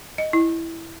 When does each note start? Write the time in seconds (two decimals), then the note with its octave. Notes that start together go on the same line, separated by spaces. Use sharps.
0.18 D#5
0.33 E4